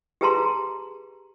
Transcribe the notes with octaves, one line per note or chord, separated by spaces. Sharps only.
G4 G#4 B4 A5 A#5 C6